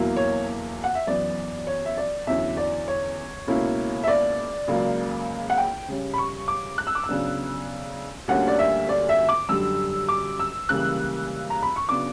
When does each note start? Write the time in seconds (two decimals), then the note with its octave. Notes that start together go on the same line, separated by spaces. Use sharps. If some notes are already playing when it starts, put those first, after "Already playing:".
Already playing: E2 B2 F#3 A#3 E4
0.16 C#5
0.84 F#5
0.95 E5
1.07 F#2 E3 B3 D5
1.67 C#5
1.86 E5
1.97 D5
2.27 E2 D3 F#3 C#4 E4 E5
2.57 D5
2.88 C#5
3.47 C#2 B2 A#3 C#4 E4
4.03 E5
4.07 D5
4.68 C#2 C#3 F#3 A#3
5.50 F#5
5.58 G5
5.88 C#3 G3 C#4
6.14 B5
6.18 C#6
6.48 D6
6.78 F#6
6.87 E6
6.95 D6
7.04 E6
7.09 C#3 F#3 B3 D4
8.28 D2 D3 G3 A#3 C#4 F#5
8.48 D5
8.59 E5
8.89 D5
9.09 E5
9.29 D6
9.49 F#2 D3 G3 E6
10.08 D6
10.39 E6
10.69 C#2 C#3 E3 G3 A#3 F#6
11.50 A#5
11.63 B5
11.76 C#6
11.89 C#3 F#3 B3 D4 D6